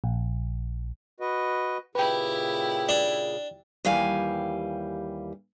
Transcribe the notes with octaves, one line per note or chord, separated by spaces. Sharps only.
A#1
F#4 B4 D#5
A#2 C#3 E4 G4 B4 G5
D4
D#2 E3 G3 F5 G#5